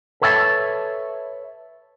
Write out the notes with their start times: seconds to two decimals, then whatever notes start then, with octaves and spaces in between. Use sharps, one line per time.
0.22 A4 B4 C#5 E5 F#5 A5